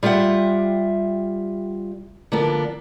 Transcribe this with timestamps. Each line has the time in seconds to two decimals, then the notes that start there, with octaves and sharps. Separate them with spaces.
0.03 G3 F4 G4 E5 F#5
2.32 D3 F3 A#3 B3 D4